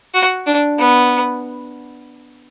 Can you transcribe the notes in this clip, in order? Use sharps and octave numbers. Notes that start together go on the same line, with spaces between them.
F#4
D4
B3